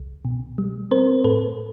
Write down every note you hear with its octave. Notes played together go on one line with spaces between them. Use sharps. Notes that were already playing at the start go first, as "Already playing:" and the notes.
Already playing: C2
B2
G3
C4 A#4 C5
A2 A4 B4